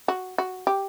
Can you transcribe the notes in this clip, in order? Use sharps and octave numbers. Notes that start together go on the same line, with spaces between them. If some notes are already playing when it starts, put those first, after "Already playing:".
F#4
F#4
G4